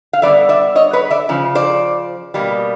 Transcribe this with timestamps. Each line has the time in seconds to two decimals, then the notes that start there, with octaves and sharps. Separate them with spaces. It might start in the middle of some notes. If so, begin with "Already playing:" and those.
0.13 F5
0.22 D3 G3 B3 D5 E5
0.49 D5 E5
0.76 C#5 D#5
0.93 B4 C#5
1.10 D5 E5
1.29 C#3 F3
1.55 C5 D5
2.34 B2 G3 A#3